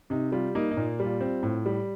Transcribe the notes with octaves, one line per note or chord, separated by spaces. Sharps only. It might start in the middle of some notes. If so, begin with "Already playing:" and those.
C3 D#4
G3 F4
A#3 D#4
D#4
A#2
G3 F4
C4
A2
G3